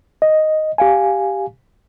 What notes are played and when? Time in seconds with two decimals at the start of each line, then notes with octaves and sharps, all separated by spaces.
0.22 D#5
0.78 G4 F5 G#5